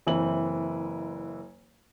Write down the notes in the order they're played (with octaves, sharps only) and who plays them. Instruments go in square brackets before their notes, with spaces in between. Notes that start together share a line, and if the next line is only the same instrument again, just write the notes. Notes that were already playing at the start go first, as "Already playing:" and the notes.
[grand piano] F#1 E3 C4 F#7